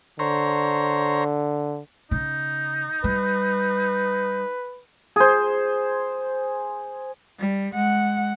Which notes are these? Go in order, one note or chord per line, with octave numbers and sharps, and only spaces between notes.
D3 C5 C#5 A#5
C#3 D#4
G3 B4
G#4 C5
G3
G#3 F#5